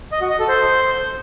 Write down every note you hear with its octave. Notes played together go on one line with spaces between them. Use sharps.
D#5
F#4
D#5
A4
C5